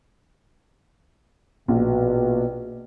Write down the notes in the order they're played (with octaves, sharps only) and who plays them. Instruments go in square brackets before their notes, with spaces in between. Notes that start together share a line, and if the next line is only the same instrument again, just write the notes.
[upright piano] A#1 [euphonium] B2